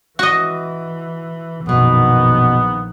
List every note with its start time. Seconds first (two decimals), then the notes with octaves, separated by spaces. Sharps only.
0.19 E3 F#4 D#5
1.66 A#1 F#2 B2 D#3 B3